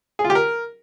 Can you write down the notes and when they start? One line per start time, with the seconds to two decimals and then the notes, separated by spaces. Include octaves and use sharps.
0.19 G#4
0.24 F4
0.30 G4
0.35 A#4